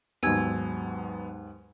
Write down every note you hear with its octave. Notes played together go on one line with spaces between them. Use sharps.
D#2 G#2 F#3 B3 G#5 E6 G#6